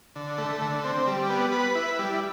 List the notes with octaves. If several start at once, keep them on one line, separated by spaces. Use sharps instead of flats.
D3
A3
D3
C4
G3
B3
B4
E4
G3